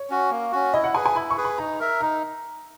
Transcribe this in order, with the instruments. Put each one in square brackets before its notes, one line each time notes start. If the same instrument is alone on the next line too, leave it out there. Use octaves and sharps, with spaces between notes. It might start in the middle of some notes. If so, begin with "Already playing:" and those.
Already playing: [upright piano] C#5
[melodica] C#4 F#4
A#3
C#4 F#4
[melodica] E4 [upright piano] D#5
[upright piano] F#5
[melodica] G#4 [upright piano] G#5
[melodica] B4
[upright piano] G#5
[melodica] E4 [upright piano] B5
[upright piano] C#6
[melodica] G#4 B4
[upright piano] B5
[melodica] D#4 [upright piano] A#5
[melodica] A#4 E5
[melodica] D#4 [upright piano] A#5